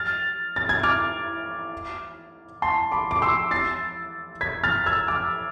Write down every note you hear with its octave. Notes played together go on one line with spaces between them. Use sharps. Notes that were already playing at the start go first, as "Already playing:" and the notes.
Already playing: F6 A6
A6
G#6
D6 F6
A5 C6
B5 D6
D6
C6 E6
A6 C7
G#6 B6
F6 A6
E6 G#6
D6 F6